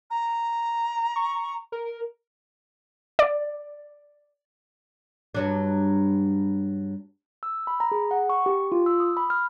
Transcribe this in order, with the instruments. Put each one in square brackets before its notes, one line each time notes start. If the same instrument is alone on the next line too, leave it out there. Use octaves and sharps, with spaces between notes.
[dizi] A#5
[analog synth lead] C#6
A#4
[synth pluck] D5
[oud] G2 F#3 D4
[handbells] E6
B5
A#5
G#4
F#5
C#6
G4
F4
E6
D#6
B5
F6